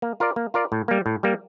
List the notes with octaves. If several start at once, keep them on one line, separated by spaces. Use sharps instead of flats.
A#3
F4 A#4 D5
A#3
F4 A#4 D5
A2
G3 A#3
A2
G3 A#3